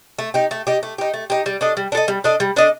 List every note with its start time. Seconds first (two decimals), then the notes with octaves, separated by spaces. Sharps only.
0.19 A3
0.34 D#4 G4
0.51 A3
0.67 D#4 G4
0.83 A3
0.98 D#4 G4
1.14 A3
1.30 D#4 G4
1.46 G3
1.61 D4 A4 D#5
1.77 G3
1.92 D4
1.95 A4 D#5
2.08 G3
2.24 D4 A4 D#5
2.40 G3
2.56 D4 A4 D#5